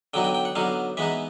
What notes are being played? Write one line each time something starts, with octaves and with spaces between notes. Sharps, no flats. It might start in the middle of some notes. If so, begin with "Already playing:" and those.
D3 F#3 B3 D#4 G5
G5
G5
F#5
D3 F#3 B3 D#4 F5
E3 G#3 B3 D#4 E5